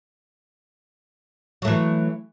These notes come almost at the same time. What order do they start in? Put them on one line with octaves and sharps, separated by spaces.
F#3 A3 E3